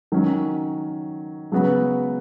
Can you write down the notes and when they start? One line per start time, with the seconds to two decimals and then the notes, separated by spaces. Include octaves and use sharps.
0.12 D#3 F#3 C#4
1.52 C#3 F#3 B3 F#4